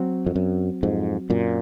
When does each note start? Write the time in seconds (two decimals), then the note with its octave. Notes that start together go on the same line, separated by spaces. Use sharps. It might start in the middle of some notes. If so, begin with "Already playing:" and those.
Already playing: F#3 C4 F#4
0.26 F2
0.36 F#2
0.83 F2 G#2
1.30 F#2 A#2